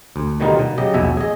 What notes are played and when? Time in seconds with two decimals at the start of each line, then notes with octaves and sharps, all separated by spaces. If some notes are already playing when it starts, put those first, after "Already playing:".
0.16 D2
0.40 B2 D3 D#3 G3 D#4 F4
0.59 B2
0.78 C#3 F#3 G4 D#5
0.94 A#1 E2 B2 B3 E5 G#5
1.17 G#4 D#5